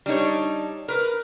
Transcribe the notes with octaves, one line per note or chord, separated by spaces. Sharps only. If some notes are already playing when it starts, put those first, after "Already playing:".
G3 D4 D#4 C#5
A#4 B4